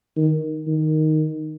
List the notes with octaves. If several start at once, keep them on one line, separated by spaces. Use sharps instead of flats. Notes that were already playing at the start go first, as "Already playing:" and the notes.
D#3
D#3